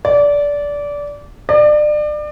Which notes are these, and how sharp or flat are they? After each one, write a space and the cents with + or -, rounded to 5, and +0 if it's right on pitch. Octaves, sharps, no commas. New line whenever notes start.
D5 -20
D5 +30